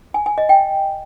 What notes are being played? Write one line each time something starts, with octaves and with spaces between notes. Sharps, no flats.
G#5
G#5
D#5
G5